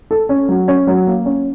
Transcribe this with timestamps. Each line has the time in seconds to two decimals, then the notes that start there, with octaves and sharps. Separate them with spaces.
0.11 A4
0.29 C#4
0.49 F#3
0.68 C#4
0.87 F#3
1.07 A#3
1.26 C#4